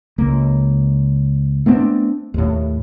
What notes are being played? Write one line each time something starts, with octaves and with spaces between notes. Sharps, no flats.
C#2 A#3
A3 B3 C4 D4
D#2 A2